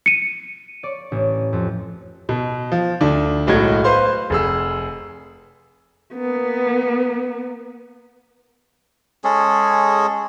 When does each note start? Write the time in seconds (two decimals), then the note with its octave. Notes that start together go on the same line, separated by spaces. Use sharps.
0.06 C#7 D#7
0.83 D5 C#6
1.12 A1
1.53 F2
2.29 B2
2.72 F3
3.01 D2 D4
3.47 B1 A2 G#3 F#4 G#6
3.84 B4 C5 F5 C6
4.30 F1 G#4 E6
6.14 A#3 B3
9.24 G#3 C#4 G#4 A4